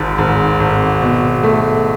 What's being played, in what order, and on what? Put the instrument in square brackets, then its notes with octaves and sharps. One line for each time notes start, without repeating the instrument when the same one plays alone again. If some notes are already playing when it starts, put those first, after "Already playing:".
Already playing: [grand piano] G#1 G#2
G#1
G#1
B2
A3